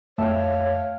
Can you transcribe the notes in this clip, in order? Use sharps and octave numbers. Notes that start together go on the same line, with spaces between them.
F2 A3 C#5 E5 F5 G5 A5 E6